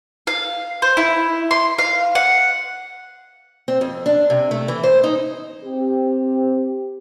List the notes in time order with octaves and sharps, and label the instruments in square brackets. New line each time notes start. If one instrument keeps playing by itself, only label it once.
[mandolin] F5
C5
E4
C6
F5
F#5
[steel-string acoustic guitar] C4
F2
D4
C3
A3
E3
C5
D#4
[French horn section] C4 G4